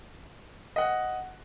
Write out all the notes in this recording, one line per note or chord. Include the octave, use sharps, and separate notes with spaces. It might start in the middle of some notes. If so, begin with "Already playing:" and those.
D#5 F#5